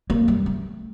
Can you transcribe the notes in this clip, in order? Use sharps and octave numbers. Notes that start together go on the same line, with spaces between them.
A#3
G3
A3